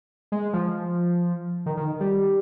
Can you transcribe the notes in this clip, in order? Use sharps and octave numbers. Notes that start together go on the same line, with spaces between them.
G#3
F3
D#3
D#3
G3